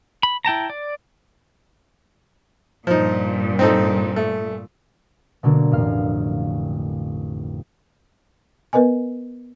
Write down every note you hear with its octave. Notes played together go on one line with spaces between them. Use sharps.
B5
E4 G5 A5 A#5
D5
G2 A#2 F3 D#4
C4 D#4 A4
A3
B2 D3 F#3 A#3 D4
A1 F2 F5 F6
B3 A#4 B4 D#5 G#5